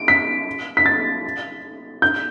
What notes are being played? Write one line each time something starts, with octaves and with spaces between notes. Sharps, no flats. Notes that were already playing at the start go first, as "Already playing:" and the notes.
Already playing: D7
B6
B6
A6
G6